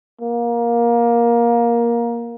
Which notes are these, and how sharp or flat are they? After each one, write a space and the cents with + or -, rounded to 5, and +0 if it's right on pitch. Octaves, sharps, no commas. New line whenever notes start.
A#3 +15